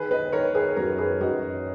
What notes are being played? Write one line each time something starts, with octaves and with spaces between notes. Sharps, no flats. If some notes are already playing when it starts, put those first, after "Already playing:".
Already playing: D#3 G#4 B4
B4 D#5
D#3 A#4 C#5
G#4 B4
F#2 F#4 A#4
G#4 B4
F#2 D#4 F#4